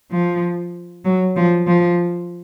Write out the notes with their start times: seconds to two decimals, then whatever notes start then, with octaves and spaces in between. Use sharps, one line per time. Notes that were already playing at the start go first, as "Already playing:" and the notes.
0.11 F3
1.05 F#3
1.36 F3
1.67 F3